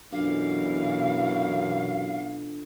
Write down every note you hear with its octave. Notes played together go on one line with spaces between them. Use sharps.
F#2 B2 E3 D4 F4 A4 F5